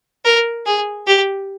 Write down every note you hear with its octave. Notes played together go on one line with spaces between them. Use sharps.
A#4
G#4
G4